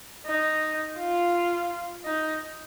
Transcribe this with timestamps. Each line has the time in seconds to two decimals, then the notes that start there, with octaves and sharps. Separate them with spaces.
0.27 D#4
0.98 F4
2.06 D#4